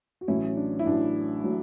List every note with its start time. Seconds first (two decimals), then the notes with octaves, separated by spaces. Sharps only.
0.21 F#4
0.28 A1 A2 F#3 C#4 E4
0.56 D4
0.79 E4
0.86 A1 A2 F#3 D4
1.44 A2 F#3